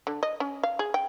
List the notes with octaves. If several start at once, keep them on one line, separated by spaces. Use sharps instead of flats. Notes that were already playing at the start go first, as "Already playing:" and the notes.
D3
D#5
C#4
F5
G#4
G5